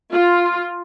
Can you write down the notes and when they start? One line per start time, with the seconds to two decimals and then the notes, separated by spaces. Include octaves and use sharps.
0.12 F4